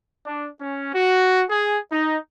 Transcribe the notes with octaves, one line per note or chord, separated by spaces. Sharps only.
D4
C#4
F#4
G#4
D#4